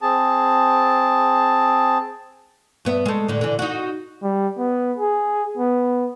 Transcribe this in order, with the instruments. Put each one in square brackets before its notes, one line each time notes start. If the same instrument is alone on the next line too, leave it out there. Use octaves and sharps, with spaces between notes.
[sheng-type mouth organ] C4 G#4 A5
[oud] G2 B3 E5
G#3 A3
A2 D3
D3 E3
D#4 F#4
[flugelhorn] G3
B3
G#4
B3